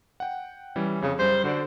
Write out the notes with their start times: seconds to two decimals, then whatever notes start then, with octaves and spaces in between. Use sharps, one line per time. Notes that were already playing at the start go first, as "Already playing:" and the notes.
0.20 F#5 G5
0.76 E3 G3 C#4
1.02 F2 C#3
1.19 F#2 G3 C5
1.44 D3 F#4 C5 D5